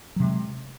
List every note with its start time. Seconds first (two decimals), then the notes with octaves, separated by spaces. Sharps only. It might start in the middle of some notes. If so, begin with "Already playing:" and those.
0.16 F#3
0.20 C3
0.23 G#3